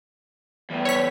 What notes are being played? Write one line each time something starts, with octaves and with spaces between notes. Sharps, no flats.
E2 A2
C#5 B6